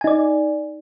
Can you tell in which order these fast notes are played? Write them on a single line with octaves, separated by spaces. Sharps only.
G#5 D#4 D5